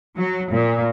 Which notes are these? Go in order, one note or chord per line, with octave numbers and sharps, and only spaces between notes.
F#3
A#2